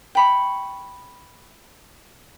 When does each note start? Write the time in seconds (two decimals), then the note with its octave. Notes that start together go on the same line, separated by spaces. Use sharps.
0.15 G5 B5 C#6